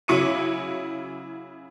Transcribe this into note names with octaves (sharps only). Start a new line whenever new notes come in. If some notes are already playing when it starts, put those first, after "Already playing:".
C#3 F#3 E4 D6 C#7 D#7